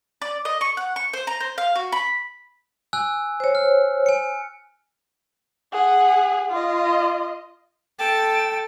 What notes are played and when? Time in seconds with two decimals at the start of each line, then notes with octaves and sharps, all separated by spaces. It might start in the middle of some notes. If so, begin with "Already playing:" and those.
0.22 D5
0.45 D#5
0.61 C#6
0.77 F#5
0.96 C#6
1.13 C5
1.27 A#5
1.40 C5
1.58 F5
1.76 F#4
1.92 B5
2.93 G#5 E6 F#6
3.40 C5 C#5
3.55 F6
4.06 G#5 C#7
5.73 G#4 F#5
6.50 F4 D#5
7.99 A4 G5 A5